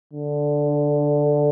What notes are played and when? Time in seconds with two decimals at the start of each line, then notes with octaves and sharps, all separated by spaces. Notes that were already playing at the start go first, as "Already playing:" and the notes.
0.13 D3